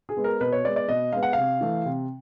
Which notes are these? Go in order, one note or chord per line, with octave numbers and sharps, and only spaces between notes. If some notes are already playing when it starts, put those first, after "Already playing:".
G#4
G#3 B3
A#4
B2 B4
C#5
G#3 B3 D5
D5
B2 D#5
G#3 B3 F5
F#5
C3 F5
E3 A3
C3